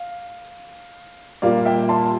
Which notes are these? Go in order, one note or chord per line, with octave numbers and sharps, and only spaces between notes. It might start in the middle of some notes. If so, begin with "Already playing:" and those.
Already playing: F5
A#2 G3 A#3 D5 F5
E5 G5
A5 C6